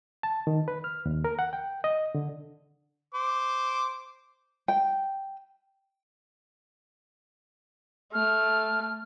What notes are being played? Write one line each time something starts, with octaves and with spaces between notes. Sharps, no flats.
A5
D#3
B4
F6
D#2
A#4
F#5
G5
D#5
D3
C5 D6
G5
A3 F6